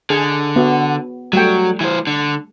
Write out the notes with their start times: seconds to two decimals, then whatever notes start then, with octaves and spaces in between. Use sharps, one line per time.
0.10 D3 G#4 G#5
0.56 B3 F#4
1.33 F#3 G3 A3 G5
1.81 E3 C5
2.07 D3